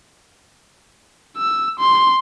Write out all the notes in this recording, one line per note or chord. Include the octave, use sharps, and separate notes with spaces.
E6
C6